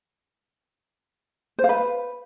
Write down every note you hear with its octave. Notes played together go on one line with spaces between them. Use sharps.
C5
F5
B4